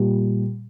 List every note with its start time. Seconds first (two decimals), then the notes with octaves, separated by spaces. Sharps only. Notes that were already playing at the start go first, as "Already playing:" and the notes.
Already playing: A#2 G3